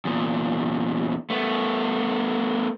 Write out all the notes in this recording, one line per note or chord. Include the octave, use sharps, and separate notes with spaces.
E2 A#2
A3 B3